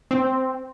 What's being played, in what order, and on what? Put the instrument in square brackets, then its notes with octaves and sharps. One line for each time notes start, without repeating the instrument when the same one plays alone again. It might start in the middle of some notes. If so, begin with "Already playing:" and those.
[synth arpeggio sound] C4